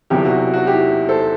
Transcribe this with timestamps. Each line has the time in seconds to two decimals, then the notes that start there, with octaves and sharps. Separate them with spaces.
0.10 E1 E2 C3 F#3 E4 G4
0.25 F#4
0.54 F#4
0.67 E4 G4
1.09 A4 C5